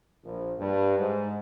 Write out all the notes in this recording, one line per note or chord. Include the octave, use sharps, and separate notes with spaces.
A#1
G2
G#2